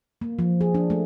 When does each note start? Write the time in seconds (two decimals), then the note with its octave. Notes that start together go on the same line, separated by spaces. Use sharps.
0.21 A#3
0.39 F3
0.61 G#4
0.74 D4
0.90 A3